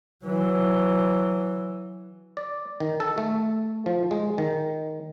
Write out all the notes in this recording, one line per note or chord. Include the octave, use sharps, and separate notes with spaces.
E3 F#3
D5
D#3
A4
A3
F3
G#3
D#3